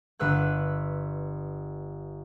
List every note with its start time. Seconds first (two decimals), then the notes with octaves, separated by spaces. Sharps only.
0.19 G1 B4 E6 F#6